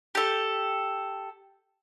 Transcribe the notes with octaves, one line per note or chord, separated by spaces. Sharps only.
G4 A4